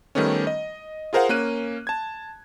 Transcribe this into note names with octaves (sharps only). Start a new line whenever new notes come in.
D#3 G3 A3 B3 C#4
D#5
F4 G#4 A#4 C5 F5 F#5
A#3 C#4 F#6 D#7
A5 G#6